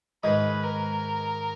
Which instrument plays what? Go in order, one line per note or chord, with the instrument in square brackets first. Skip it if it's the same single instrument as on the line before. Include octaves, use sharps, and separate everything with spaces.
[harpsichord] G#2 D#3 G#3 D#4 [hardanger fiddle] B4
[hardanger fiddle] A#4